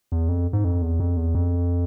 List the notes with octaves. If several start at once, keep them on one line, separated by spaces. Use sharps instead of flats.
E2
F2
G#2
F2
E2
F2
E2
F2